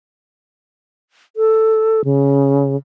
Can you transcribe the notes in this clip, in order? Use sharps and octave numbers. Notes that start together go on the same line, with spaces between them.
A4
C#3